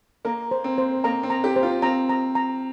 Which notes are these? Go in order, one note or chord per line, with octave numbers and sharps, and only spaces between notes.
A#3 A#5
C5
C4
C5
A#3 A#5
C4
A#5
G4
C5
F4
C4 A#5
A#5
A#5